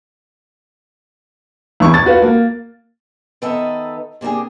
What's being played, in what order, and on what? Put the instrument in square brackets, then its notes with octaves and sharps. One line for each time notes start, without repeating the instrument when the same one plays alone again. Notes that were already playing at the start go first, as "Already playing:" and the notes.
[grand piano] E2 C#6
A6
F4 F#4 B4
A#3
[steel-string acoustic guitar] D#3 B3 A4 D#5 E5 A#5
C3 A#3 D4 G4 G#4